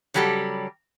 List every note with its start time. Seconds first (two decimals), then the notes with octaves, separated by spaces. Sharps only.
0.14 C#3 F#3 G3 G4 A4